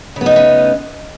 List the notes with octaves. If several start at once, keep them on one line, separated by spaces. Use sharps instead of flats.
C#3 A3 B3 C#4 D#4